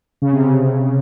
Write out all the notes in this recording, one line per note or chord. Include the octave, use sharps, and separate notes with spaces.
C#3
C3
C#3